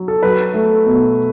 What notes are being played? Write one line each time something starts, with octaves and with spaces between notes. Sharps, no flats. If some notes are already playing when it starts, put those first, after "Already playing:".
Already playing: F#3
A4
F#3 B4
A3
B2